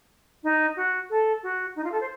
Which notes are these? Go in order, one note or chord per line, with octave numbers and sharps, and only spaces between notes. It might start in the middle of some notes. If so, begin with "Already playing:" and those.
D#4
F#4
A4
F#4
D#4
F4
A4
C5